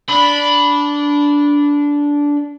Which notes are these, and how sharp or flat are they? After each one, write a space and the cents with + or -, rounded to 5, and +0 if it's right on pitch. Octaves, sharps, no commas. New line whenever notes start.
D4 -15 B5 +0